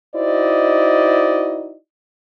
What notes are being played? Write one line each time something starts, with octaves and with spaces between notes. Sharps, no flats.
D#4 E4 F#4 C5 D5 D#5